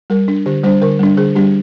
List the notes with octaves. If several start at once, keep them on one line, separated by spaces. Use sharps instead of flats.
G3 A#4
D4
D3 G4
G3 D4 C5
D3 A#4
G3 D4
D3 G#4
G3 D4 G4